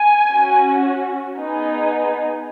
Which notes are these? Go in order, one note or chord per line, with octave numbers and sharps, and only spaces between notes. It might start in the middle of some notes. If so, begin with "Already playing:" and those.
Already playing: G#5
C#4 F#4
B3 D#4 G#4